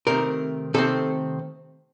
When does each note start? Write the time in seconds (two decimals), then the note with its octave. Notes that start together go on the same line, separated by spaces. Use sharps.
0.07 C3 D#3 A3 C4 A#4
0.74 C3 D#3 A3 C4 A4